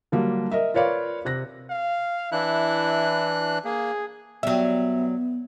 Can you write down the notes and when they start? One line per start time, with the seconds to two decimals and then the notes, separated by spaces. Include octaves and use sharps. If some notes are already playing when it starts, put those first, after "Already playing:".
0.12 D3 F#3 G3 A#3 D4
0.51 A#4 D#5 E5
0.74 F4 A#4 B4 C#5 D5 F5
1.25 C3 F#6 A#6
1.70 F5
2.32 E3 D4 E4 F#6
3.65 A#3 G#4
4.43 F#3 G3 B3 E5